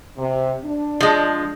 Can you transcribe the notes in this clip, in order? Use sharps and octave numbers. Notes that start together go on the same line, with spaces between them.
C3
D4
F3 G#3